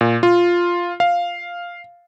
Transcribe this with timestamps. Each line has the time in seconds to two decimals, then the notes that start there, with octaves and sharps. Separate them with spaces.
0.01 A#2
0.23 F4
1.00 F5